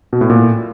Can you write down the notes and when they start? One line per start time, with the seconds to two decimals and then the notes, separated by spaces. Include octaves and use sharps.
0.13 B2
0.21 A2
0.30 A#2